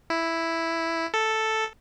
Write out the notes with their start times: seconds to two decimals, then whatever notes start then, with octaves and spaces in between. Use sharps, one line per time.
0.10 E4
1.14 A4